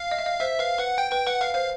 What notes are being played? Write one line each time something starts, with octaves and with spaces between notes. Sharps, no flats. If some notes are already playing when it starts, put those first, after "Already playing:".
Already playing: F5
D#5
E5
D#5
C5 E5
B4 F5
B4 F#5
G5
B4 G5
B4 F#5
B4 F5
C5 F5